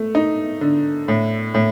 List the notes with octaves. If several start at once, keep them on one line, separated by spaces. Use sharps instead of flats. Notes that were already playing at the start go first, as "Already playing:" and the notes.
Already playing: A3
D#4
D3
A2
A2